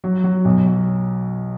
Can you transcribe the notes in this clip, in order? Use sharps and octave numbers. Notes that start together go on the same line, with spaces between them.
F#3
F#3
B1
F#3